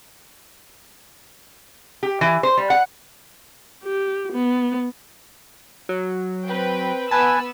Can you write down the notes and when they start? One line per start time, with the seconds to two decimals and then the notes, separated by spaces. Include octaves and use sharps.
2.03 G4
2.21 E3
2.43 C5
2.57 G3
2.70 F#5
3.84 G4
4.33 B3
5.89 F#3
6.47 C4 B4 G5
7.11 B3 B4 G#5 A5 E6